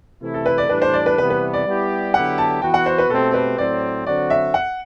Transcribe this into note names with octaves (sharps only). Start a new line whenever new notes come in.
C3 E3 A3 E4
A4
B4
D5
A2 E3 G3 D4 B4
C5
D5
B4
C3 E3 G3 B3 B4
B4
D5
G3 B3 E4 G4
D3 F#3 B3 E4 G4 F#5
A5
E3 B3 F#4 G5
F#5
C5
B4
B2 A3 C4 G4 A4
B4
A2 F#3 C4 D5
D3 F#3 C4 F#4 D5
E5
F#5